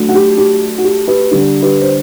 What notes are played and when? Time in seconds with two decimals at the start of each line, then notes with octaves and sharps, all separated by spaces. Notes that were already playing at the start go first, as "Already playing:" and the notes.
Already playing: F#3 A3 D4
0.09 F#4
0.14 G4
0.38 G4
0.78 F#4
0.84 G4
1.07 G4 B4
1.31 D3 G3 D4 G4
1.62 G4 B4
1.81 C5